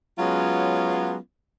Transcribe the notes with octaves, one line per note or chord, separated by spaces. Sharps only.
F#3 G#3 B3 C#4 F4